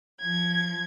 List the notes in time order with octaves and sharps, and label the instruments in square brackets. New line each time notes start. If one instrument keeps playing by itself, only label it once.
[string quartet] F3 G#6